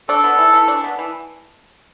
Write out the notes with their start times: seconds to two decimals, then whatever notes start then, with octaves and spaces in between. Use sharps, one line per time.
0.09 D4 A4
0.24 B3
0.39 E3
0.53 E3
0.68 D4
0.84 B3
0.99 E3